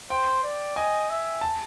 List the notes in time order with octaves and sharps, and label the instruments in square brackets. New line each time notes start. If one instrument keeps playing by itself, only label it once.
[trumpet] C5 [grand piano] G5
[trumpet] D5
[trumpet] D#5 [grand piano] G#5
[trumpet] E5
[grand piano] A5